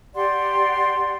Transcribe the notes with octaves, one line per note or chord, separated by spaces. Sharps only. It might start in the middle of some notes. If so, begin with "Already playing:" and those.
G4 D5 F#5 C6